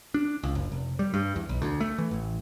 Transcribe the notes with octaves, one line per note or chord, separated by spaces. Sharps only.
D4
C#2
F#1
F1
G3
G2
E2
B1
D2
A3
E3
A1